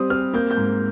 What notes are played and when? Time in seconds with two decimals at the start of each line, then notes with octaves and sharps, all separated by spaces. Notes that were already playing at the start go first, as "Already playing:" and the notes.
Already playing: G3 C4 D#6
0.10 C4 F6
0.34 A#3 G6
0.51 G6
0.57 G#2